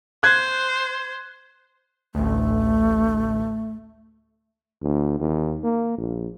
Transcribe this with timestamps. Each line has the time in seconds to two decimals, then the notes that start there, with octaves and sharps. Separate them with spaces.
0.23 C5 F#6 G#6
2.15 A1 D2 A3
4.82 D2
5.20 D#2
5.64 A#3
5.98 A#1